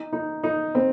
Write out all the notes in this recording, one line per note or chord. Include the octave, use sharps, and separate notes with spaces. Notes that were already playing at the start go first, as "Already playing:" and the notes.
Already playing: D#4
D#4
D#4
C4